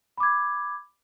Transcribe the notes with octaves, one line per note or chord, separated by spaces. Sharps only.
B5 D6 G#6